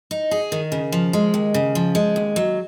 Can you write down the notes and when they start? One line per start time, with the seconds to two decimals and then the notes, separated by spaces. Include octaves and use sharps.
0.11 D#4
0.31 G#4
0.52 D#3
0.72 C#3
0.92 F3
1.13 G#3
1.34 D#2
1.54 C#3
1.75 F3
1.95 G#3
2.16 D#2
2.36 F#3